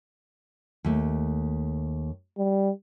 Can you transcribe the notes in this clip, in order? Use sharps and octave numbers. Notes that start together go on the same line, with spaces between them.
D#2 A3
G3